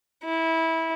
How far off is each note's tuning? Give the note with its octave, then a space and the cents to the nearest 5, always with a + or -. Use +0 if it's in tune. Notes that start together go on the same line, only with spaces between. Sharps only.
E4 -20